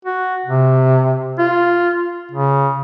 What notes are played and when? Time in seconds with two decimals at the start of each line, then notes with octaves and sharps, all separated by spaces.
0.05 F#4
0.46 C3
1.39 F4
2.32 C#3